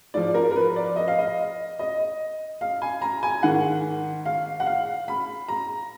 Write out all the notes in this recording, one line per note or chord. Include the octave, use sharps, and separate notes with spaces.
G#2 F3 D5
A#4
A#4
B4
D5
D#5
F5
D#5
D#5
F5
G#5
A#5
G#5
G#2 D#3 F#5
F5
F#5
F5
B5
A#5